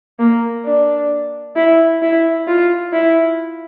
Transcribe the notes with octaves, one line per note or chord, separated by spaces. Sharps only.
A#3
D4
E4
E4
F4
E4